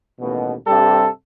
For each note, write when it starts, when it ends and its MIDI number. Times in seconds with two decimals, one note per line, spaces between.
0.21 0.54 33
0.21 0.54 39
0.21 0.54 47
0.67 1.08 43
0.67 1.08 48
0.67 1.08 55
0.67 1.08 67
0.67 1.08 69